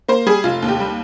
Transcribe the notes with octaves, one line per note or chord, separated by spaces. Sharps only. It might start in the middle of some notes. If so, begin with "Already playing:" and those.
A#3 C5
G3 G#4
F1 F4
D#2
G4
G3